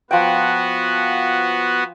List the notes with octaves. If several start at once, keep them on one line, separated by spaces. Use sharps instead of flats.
F3 B3 F#4 G5